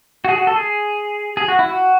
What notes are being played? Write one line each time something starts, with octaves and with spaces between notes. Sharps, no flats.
F#4
G#4
F#4
A4
G#4
G#4
F#4
E4
F#4